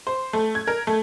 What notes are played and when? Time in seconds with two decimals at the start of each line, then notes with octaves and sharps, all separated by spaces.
0.07 C5
0.33 A3
0.55 G#6
0.67 A#4
0.87 A3